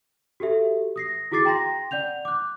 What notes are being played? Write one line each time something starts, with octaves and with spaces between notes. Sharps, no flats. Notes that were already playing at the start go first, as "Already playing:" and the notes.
F#4 G4 A4 E5
D#6 A#6 C7
E4 F#4 G#4 D6 A6 C7
G5 A#5 C6 A#6
D5 F#5 G6 F7
D6 F#6